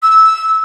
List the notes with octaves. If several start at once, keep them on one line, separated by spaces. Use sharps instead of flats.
E6